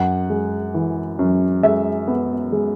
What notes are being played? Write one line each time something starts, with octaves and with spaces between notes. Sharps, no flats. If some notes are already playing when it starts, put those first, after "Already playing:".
Already playing: F#2 F#5
G#3
E3
F#2
G#3 E5
B3
G#3